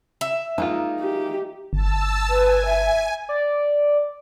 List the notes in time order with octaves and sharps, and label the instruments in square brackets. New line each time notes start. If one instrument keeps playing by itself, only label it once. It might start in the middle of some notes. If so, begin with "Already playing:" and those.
[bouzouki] E5
[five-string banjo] G#3 A#3 F4 [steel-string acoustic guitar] D#4
[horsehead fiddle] G4
[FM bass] G1 [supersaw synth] A5 E6
[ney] B4 [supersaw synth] G#5
[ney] E5
[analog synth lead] D5